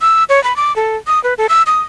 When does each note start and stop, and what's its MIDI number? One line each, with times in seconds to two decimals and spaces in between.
0.01 0.24 88
0.29 0.42 73
0.44 0.56 83
0.56 0.75 86
0.76 0.97 69
1.07 1.22 87
1.24 1.34 71
1.38 1.47 69
1.49 1.63 88
1.67 1.80 87